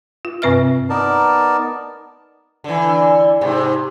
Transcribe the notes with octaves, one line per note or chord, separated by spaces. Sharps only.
F4
G2 C3 C4 B4 E5 F6
B3 D#4 A#4 D5 A5
D3 E3
G#2 C3